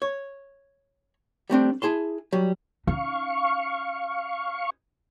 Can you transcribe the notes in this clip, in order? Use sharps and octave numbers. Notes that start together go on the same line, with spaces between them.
C#5
G3 A3 C4 D4
E4 G#4 A5 C6
F#3 G3
C#4 D#4 F5 C#6